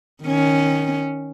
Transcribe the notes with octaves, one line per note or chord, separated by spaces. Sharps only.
D#3 C#4